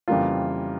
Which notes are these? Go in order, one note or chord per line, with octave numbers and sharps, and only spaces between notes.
F2 C#3 E3 G3 A#3 F4